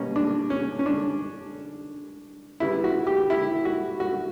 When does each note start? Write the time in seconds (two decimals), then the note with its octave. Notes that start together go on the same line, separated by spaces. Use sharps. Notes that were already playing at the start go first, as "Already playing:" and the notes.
Already playing: B2 G3 A#3 C#4
0.16 D4
0.50 C#4
0.79 C#4
0.86 D4
2.60 C#3 G3 B3 E4
2.84 F#4
3.07 G4
3.30 E4
3.65 F#4
4.00 F#4